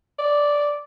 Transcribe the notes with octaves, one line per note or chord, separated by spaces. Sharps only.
D5